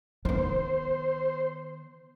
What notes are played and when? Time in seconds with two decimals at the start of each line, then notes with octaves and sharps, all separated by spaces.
0.25 D#3 B3 C5